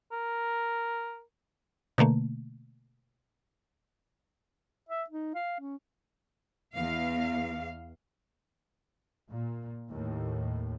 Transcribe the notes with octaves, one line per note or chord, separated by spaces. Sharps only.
A#4
B2 D3 A3 A#3
E5
D#4
F5
C#4
E2 F5
A#2
D#2 A2